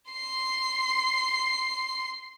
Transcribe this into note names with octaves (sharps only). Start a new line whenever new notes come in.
C6 C7